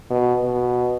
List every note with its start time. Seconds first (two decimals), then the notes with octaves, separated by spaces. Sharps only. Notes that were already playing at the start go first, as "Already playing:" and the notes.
0.10 B2
0.44 B2